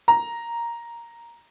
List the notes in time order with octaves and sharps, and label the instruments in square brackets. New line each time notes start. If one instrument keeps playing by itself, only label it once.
[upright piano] A#5